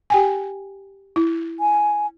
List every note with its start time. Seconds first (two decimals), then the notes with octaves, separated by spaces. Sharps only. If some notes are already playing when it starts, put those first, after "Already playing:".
0.10 G4 G5 G#5
1.16 E4
1.60 G#5